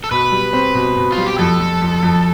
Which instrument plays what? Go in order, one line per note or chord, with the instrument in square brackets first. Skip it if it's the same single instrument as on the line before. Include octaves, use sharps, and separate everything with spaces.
[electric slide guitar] A4
[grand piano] B2 [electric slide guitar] B4
[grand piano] G3
C4
B2
B2
[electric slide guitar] F4
[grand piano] G3
[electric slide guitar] G4
[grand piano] F2 [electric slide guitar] A4
[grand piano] F2
F2
F2